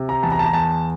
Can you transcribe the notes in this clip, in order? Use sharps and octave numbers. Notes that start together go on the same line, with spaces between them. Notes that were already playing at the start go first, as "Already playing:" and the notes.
Already playing: C3
A#5
E2 A5
A#5
A5
A#5
E2 A5